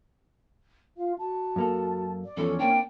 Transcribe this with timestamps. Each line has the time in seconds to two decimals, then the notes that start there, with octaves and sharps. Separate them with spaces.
0.97 F4 F5
1.19 F#4 A5
1.56 F#2 A#3 A4
2.24 D5
2.37 E2 E3 F3 C#4 A4
2.59 A#3 C4 D4 G5